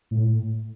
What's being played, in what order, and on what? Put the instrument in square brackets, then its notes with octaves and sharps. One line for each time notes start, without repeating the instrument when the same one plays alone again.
[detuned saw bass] A2